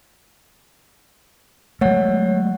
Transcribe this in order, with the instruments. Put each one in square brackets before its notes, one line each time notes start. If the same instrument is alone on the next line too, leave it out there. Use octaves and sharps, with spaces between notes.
[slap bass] F#3 G#3 A3 [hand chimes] C#5 F#5